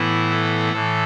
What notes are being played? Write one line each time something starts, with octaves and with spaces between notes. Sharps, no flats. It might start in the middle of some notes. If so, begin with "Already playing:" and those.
Already playing: A2 E3 B3 E4
A4
A2 E3 A4